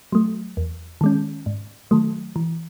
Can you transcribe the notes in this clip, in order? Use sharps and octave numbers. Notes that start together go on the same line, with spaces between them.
F#3 A3
E2
D#3 G#3 C#4
G#2
D#3 F#3 A3
E3